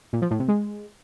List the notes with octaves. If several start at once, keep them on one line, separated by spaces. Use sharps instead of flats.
A#2
F3
A2
C3
G#3